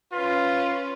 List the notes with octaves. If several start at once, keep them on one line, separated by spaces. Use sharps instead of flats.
C#4 F4 B4